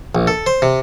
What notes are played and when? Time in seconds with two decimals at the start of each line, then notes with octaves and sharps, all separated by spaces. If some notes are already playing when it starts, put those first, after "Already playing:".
0.15 A#1
0.27 A4
0.46 C5
0.62 C3